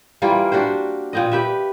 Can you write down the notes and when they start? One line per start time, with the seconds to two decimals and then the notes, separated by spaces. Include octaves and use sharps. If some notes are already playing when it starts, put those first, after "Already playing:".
0.22 E3 G3 A#3 F4
0.52 D4 F#4 G4 C5
1.13 A#2 C4 D#5
1.32 G4 B4 E5